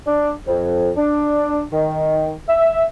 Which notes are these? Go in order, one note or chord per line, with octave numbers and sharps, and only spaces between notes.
D4
F2
D4
D#3
E5